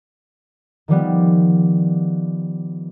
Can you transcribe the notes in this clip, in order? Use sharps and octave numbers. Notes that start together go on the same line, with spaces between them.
D#3 F3 G3 B3